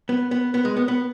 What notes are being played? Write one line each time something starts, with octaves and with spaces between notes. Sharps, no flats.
B3
B3
B3
G#3
B3
B3